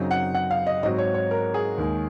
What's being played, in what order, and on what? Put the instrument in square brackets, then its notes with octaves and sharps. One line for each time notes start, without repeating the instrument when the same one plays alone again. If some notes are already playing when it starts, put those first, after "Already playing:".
Already playing: [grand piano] F#2 C#3 F#3 C4 D#4
[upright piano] F#5
F#5
F5
D#5
[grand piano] G#2 F#3 C4 F#4 [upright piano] D#5
[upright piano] C#5
C#5
A#4
G#4
[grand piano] D#2 D#3 G#3